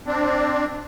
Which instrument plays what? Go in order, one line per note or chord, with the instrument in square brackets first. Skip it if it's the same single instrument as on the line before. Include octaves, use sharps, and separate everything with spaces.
[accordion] C4 D4